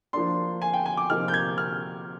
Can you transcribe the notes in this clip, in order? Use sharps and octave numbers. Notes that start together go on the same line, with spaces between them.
F3 A#3 D4 C6
G#5
G5
G#5
D6
C3 F3 A#3 D#4 F6
G6
G#6
F6